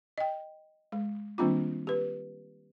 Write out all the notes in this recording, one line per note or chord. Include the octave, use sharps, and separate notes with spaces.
D#5 G5
G#3
D#3 G3 A#3 C4 D4 F4
G4 B4